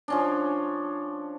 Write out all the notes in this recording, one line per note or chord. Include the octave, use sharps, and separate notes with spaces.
F3 C#4 D4